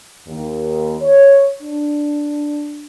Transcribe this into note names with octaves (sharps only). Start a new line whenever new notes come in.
D#2
C#5
D4